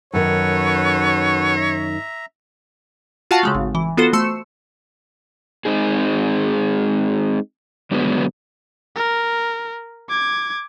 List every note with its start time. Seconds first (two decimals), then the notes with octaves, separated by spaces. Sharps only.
0.13 F#2 D#3 F#4 A4 B4 C#5
1.56 E5 A#5
3.31 F4 F#4 F5 F#5 A5 C#6
3.43 C#3 G#3 A3
3.55 G#1
3.75 E3
3.97 B3 F4 F#4 A4 C5
4.13 A3 C6 E6 C#7 E7
5.65 G#3 C4 D#4 G#4
7.91 G2 D3 F#3 G#3 B3
8.96 A#4
10.10 D6 G#6